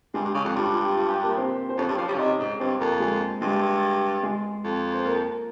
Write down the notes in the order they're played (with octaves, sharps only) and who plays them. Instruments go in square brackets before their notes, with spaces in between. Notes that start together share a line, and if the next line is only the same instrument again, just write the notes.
[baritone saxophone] G2 [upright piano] G#3 G#4
[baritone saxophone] G2
C#3
F2
[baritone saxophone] G2 [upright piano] F4
[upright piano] F4
G4
F4
G4
A#3 A#4
C4 C5
C5
[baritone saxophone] F2 [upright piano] C#4 C#5
[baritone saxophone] G2
[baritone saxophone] F3 [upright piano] C#4 C#5
[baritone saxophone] G3
C#3
[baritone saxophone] C3 [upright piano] D#4 D#5
[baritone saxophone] G#2
[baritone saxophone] G2 [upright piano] C4 C5
[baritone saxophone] F2 [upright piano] A#3 A#4
[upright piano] G#3 G#4
[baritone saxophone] G2 [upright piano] G#3 G#4
[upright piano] G#3 G#4
[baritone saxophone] F2
[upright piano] C5
A#3 A#4